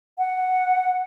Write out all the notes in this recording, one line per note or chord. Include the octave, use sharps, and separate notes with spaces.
F#5